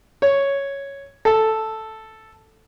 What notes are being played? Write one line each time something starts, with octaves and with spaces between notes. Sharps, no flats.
C#5
A4